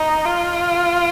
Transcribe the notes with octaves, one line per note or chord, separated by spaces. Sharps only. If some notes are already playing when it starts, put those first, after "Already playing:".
Already playing: D#4
F4